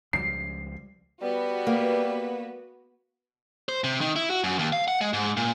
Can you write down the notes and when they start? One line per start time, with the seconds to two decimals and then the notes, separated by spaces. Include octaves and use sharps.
0.13 C#2 F3 G3 C7
1.22 G3 B3 F#4 B4
1.67 A#3
3.69 C5
3.84 C3
4.01 D#3
4.16 E4
4.30 F#4
4.44 F#2
4.59 D#2
4.73 F5
4.88 F#5
5.01 G#3
5.13 G#2
5.37 A#2